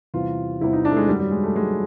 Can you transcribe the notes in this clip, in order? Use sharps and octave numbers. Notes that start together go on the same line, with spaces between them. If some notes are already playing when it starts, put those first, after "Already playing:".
E2 C3 E3 G3 F4
E2 C3 E3 G3 E4
D#4
D4
A3
G#3
F#2 D#3 F#3 G3
G3
G#3
A3
F#2 D#3 F#3 G#3